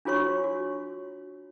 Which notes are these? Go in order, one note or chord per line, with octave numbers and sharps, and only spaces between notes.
D4 F4 F#4 C#5 C#6
F#4